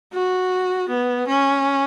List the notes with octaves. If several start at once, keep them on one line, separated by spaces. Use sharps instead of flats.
F#4
B3
C#4